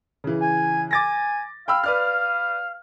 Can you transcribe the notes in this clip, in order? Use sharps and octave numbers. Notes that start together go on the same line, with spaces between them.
C#3 E3
G#5
G#5 D6 A6 A#6
F5 G5 B5 E6
B4 D5 F6